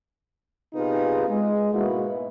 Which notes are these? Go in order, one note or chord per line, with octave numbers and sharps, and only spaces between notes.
C3 B3 D#4 F4 G#4 B4
G#3
G#2 B2 A#3 E4 F#4 B4